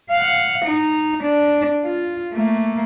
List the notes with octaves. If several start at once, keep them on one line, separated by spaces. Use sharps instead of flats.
F5 F#5
D#4
D4
F4
A3 A#3